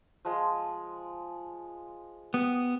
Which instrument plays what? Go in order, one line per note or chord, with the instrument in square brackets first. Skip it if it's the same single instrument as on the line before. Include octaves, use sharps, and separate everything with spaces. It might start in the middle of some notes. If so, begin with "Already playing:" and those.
[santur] F3 G#3
[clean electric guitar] B3 [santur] G4 D#6